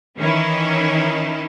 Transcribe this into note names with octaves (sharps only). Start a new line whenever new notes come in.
D#3 E3 C#4 D#4 E4